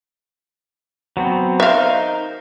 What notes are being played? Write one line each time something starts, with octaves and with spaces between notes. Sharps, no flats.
F#3 B3 C4
D#4 A#4 C5 E5 F5